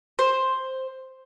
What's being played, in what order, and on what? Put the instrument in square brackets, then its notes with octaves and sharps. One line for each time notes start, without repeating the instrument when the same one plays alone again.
[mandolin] C5